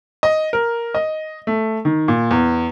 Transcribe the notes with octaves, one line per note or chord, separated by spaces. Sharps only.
D#5
A#4
D#5
A3
D#3
A#2
E2